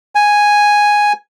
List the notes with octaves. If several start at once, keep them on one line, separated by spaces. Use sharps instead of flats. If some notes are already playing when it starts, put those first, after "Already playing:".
G#5